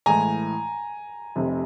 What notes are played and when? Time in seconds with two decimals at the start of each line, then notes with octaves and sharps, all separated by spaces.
0.06 A2 E3 G#3 G#5 A#5
1.36 F1 F2 C3